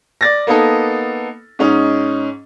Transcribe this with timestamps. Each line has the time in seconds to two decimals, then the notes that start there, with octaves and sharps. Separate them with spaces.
0.21 D5 A6 A#6
0.47 A#3 B3 D#4 A4
1.59 G#2 C#4 D#4